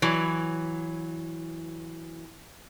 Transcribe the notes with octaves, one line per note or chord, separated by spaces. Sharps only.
E3 F#3